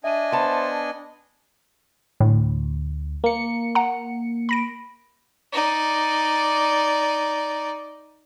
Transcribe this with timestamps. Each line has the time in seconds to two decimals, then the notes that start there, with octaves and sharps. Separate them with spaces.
0.04 D4 D#5 E5 G#5 D#7
0.32 B3 C5 A5
2.20 D2 A2
3.24 A#3 C#7
3.75 F#5 A#5
4.49 B5 A#6 D7
5.52 D#4 D5